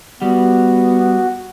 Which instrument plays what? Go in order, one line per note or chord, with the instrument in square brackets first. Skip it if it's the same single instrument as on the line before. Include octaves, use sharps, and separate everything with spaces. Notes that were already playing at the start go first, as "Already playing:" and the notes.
[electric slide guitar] G3 [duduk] B3 [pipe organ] F#4